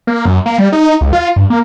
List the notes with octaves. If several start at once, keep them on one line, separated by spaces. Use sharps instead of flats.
A#3
F#2
A#3
G3
D#4
C#2
F4
G2
A#3